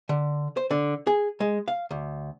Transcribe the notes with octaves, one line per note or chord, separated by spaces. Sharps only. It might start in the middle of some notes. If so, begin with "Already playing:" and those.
D3
C5
D3
G#4
G#3
F5
D2